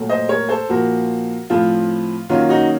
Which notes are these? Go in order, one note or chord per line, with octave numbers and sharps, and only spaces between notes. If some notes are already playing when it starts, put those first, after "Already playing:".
Already playing: A#2 F#3 A3
C5 D#5
A#4 C#5
A4 C5
A#2 F3 A#3 F#4 A#4
A2 F3 C4 F4
D#3 F#3 A#3 C#4 F4
D#4 F#4